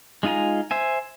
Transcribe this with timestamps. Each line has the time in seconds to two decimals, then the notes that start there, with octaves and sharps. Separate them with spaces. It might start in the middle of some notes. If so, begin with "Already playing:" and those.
0.23 G#3 D#4 F4 G#5 A#5
0.71 C5 E5 G#5